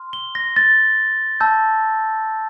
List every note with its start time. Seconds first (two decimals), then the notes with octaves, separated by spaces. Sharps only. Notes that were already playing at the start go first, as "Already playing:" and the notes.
Already playing: C6 F6
0.13 G7
0.35 A#6
0.56 A6
1.40 A5 E6 G6